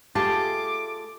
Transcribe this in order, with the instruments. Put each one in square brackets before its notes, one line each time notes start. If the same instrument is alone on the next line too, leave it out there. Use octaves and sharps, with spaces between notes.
[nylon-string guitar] A3 F4 G4 [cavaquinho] G#4 A5 [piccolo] D6